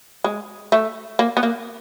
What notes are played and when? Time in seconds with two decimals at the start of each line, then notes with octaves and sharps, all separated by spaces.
0.24 G#3
0.72 A3
1.19 A#3
1.37 B3
1.43 A#3